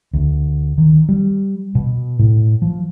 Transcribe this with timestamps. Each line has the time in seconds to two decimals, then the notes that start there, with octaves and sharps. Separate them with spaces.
0.13 D2
0.78 D#3
1.09 G3
1.75 B2
2.19 A2
2.62 F3